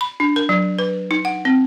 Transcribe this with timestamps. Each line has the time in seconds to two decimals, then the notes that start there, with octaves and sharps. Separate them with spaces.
0.01 B5
0.20 D4
0.36 A#4
0.49 F#3
0.79 B4
1.11 D#4
1.25 F#5
1.45 C4